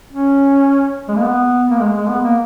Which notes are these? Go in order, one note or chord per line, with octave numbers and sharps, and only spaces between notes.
C#4
G#3
A#3
B3
A#3
G#3
G#3
B3
A#3